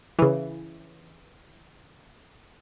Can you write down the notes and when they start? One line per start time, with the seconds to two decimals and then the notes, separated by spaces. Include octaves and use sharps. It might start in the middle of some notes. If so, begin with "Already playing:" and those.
0.19 C#3 E3